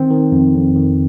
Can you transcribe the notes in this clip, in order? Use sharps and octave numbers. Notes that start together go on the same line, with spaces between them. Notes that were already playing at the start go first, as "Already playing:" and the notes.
Already playing: D#3 C4
D#3
F2
F2
D#3